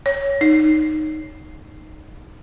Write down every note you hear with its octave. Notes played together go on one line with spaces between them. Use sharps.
C#5
D#4